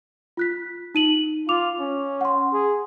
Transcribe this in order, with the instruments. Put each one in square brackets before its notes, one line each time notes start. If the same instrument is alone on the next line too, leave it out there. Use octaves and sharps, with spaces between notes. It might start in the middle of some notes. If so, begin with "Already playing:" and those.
[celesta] F4 F#6 B6
D#4 D#7 F#7
[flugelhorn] F4 [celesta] D6 F7
[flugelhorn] C#4
[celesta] F#5 C6
[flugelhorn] G#4